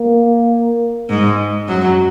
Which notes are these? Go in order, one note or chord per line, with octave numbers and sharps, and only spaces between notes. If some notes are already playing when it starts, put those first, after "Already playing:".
Already playing: A#3
G#2 G#3
F#2 F#3